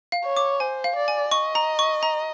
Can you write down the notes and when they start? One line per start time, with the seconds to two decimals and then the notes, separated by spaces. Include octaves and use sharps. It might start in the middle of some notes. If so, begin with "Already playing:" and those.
0.12 F5
0.24 C#5
0.37 D6
0.60 C5 G#5
0.84 F5
0.96 D5
1.08 G#5
1.31 D#5 C#6
1.55 A#5
1.79 C#6
2.03 A#5